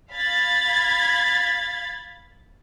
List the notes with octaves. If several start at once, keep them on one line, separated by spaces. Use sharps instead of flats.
F5 B5 G#6 A6